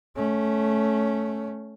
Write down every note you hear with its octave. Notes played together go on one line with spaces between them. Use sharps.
A3 C#4